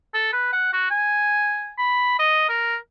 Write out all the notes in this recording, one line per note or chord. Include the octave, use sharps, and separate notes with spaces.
A4
B4
F#5
F#4
G#5
B5
D#5
A#4